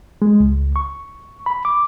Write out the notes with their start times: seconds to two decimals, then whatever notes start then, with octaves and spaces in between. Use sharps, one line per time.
0.22 G#3
0.40 C#2
0.76 C#6
1.46 B5
1.65 D6